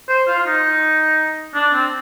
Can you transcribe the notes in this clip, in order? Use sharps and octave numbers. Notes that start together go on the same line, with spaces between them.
C5
F4
F4
D#4
D4
C4